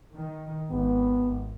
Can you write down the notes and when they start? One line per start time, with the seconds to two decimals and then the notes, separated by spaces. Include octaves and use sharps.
0.15 D#3
0.71 G#1 B3